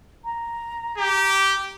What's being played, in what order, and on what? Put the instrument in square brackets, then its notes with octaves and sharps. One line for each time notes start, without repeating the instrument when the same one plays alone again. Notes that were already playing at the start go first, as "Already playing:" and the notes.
[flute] A#5
[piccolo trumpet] G4